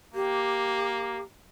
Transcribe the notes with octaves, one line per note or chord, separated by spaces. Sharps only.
A#3 G4